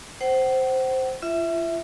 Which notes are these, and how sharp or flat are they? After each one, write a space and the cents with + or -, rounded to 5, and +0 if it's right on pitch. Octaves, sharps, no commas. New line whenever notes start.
C5 +0 F#5 +40
F4 -40 E5 +0